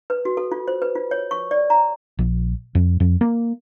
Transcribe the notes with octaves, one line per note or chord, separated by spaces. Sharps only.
B4
F#4
A4
F4
C5
B4
F4
C#5
C#6
D5
A#5
A#1
F2
F2
A#3